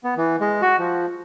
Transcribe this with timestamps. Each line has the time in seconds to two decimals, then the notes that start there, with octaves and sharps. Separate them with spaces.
0.04 B3
0.17 E3
0.41 G#3
0.62 F#4
0.79 F3